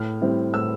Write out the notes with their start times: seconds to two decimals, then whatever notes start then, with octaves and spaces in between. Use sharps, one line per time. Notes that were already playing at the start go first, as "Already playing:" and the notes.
Already playing: A2 F6
0.21 G3 C4 E4
0.53 A2 E6